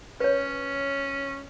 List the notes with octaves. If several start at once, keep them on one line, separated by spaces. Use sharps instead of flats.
C#4 B4 C#5